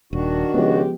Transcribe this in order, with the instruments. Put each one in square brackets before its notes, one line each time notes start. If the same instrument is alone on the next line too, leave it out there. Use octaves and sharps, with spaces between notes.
[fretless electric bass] D#1 [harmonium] D#3 D4 F#4
[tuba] C#2 [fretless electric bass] F3 B3 [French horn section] G#3 G4